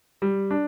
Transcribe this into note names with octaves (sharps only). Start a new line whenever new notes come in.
G3
D4